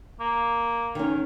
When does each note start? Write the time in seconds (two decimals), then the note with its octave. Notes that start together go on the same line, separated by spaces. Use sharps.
0.20 A#3
0.95 D#3 C#4